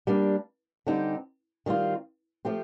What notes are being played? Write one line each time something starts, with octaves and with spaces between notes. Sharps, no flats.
G3 A#3 D4
D3 G3 C4 D#4 G4
D#3 G3 C4 F4
F3 A3 C4 G4